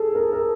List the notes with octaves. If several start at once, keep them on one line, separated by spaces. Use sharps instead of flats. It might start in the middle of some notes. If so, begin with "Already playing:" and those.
Already playing: G#4 A4
A#4
A#4